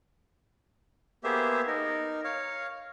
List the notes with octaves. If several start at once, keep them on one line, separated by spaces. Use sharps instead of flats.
A#3 B3 G4 G#4 C5 E5
D#4 A#4
C#5 F5